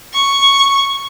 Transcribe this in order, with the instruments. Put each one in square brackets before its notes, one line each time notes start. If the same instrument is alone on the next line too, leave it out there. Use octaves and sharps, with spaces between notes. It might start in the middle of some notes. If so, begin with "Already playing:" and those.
[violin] C#6